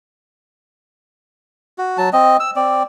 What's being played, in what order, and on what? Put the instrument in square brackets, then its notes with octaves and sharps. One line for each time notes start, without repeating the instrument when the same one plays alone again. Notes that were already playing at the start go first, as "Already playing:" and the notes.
[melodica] F#4
F#3 A5
C4 D#5
E6
C4 D5